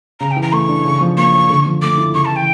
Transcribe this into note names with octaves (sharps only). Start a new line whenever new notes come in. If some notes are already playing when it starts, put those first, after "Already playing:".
C#3 A#5
G5
E3
A#5
A3 C#6
D4
C#3
F3
A#3 C#6
C#4
D3
F3
A3 D6
E4
C#3 C#6
A5
E3
G5